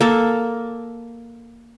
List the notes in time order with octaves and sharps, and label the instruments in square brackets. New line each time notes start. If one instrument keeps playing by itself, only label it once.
[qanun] A#3 A4